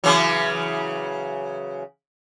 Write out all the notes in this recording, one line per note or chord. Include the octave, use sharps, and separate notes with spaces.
C#3 E3 F#3